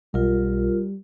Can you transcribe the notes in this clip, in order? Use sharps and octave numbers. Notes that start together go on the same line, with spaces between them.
B1 G3 F4 A#4